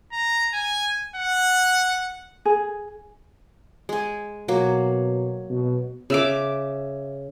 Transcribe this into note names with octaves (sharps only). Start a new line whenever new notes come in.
A#5
G#5
F#5
G#4
G#3 G#5
B2 F#3 A#3
B2
C#3 E5 D6